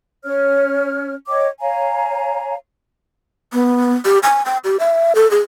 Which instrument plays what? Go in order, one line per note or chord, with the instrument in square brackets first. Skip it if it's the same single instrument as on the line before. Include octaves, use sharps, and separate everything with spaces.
[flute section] C#4 C#5 F6
C#5 D#5 G5 D6
C#5 F5 G#5 A#5
[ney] B3
G4
G#5
G5
G4
E5
A4
G#4